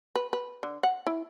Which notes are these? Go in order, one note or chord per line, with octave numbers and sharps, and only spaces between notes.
B4
B4
D3
F#5
E4